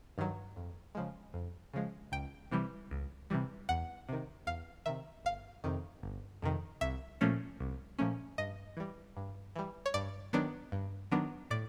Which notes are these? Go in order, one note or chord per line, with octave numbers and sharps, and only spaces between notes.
G2 D#3 F#3
F2
C#3 F3 G#3
F2
C#3 F3 G#3
C#2 G5
C3 E3 G3
C#2
C3 E3 G3
E2 F#5
C3 D#3
E2 F5
C3 D#3 E5
G1 F5
F2 C3 D#3
G1
F2 C3 D#3
C2 E5
A#2 F3 A3 C#4
C2
A#2 F3 A3 C#4
G2 D#5
E3 G3
G2
E3 G3
C#5
G2 D5
D#3 F#3 B3 D4
G2
D#3 F#3 B3 D4
A2 D5